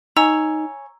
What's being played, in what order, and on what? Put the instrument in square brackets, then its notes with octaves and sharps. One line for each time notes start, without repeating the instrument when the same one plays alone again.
[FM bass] D#4 [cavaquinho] C#5 G#5 [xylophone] A#5 E6